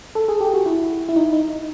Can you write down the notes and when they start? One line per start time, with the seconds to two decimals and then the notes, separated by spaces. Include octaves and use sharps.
0.15 A4
0.28 G#4
0.41 G4
0.54 F#4
0.66 E4
1.09 E4
1.16 D#4
1.33 D#4